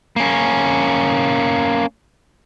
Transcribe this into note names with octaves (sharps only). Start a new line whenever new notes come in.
A#3 C#4